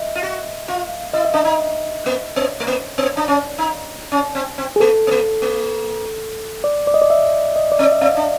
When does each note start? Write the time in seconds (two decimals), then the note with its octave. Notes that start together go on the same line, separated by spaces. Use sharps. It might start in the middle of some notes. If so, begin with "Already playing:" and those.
Already playing: D#5 E5
0.15 F4
0.23 F#4
0.68 F4
1.14 E4 D#5
1.25 E5
1.34 D4 D#5
1.45 D#4
2.06 A#3
2.36 B3
2.60 A3
2.67 A#3
2.98 B3
3.17 D4
3.28 C#4
3.58 D#4
4.12 C#4
4.35 C4
4.58 C4
4.76 G#4
4.80 A#3 A4
5.07 B3
5.11 A#3
5.42 A#3
6.64 D5
6.87 D5
6.94 D#5
7.02 D5
7.10 E5
7.56 D#5
7.72 D5
7.79 C4
7.82 D#5
7.92 E5
8.01 C4 F5
8.17 D4